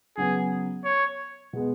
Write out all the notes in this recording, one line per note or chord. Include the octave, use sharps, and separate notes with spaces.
C#3 F#3 B3 G#4
C#5
B2 G#3 B3